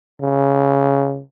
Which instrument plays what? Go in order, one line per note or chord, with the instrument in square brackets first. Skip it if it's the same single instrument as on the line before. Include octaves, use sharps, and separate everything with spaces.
[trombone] C#3